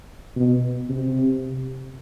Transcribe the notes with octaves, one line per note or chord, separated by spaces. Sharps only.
B2
C3